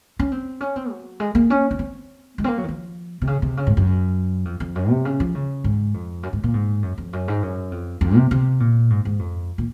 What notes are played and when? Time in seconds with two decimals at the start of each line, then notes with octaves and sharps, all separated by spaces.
0.19 C#4
0.32 C4
0.61 C#4
0.76 C4
0.91 F#3
1.20 G#3
1.35 A#3
1.50 C#4
1.71 C#4
1.79 C4
2.38 G#3
2.44 C4
2.48 A#3
2.58 F#3
2.64 D#3
2.68 F3
3.22 C3
3.27 C#3
3.42 C3
3.57 C#3
3.67 G#2
3.77 F#2
4.45 F2
4.60 F2
4.75 F#2
4.90 C3
5.05 C#3
5.20 F3
5.35 C#3
5.64 G#2
5.94 F2
6.23 F#2
6.33 G#2
6.43 A#2
6.54 G#2
6.83 F#2
6.98 F2
7.13 F#2
7.28 G#2
7.42 F#2
7.72 F2
8.01 F2
8.16 C3
8.31 C3
8.60 A#2
8.90 G#2
9.05 G#2
9.19 F2
9.58 A#2